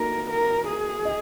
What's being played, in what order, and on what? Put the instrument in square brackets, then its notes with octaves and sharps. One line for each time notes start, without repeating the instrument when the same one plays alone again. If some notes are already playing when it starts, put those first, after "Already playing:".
Already playing: [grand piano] A#3 D#4 F#4 A4 [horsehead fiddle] A#4
[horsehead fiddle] A#4
G#4
[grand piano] D#5